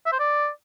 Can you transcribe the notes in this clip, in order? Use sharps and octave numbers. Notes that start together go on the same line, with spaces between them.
E5
C5
D5